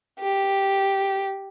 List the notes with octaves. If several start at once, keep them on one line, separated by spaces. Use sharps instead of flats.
G4